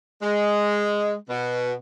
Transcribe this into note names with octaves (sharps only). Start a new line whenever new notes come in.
G#3
B2